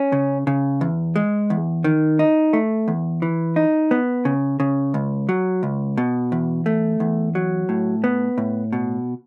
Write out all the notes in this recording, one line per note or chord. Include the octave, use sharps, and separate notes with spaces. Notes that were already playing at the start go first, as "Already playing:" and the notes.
Already playing: C#4
C#3
C#3
E2
G#3
E2
D#3
D#4
A3
E2
E3
D#4
B3
C#3
C#3
C#2
F#3
C#2
B2
E2
A3
E2
F#3
A2
B3
A2
B2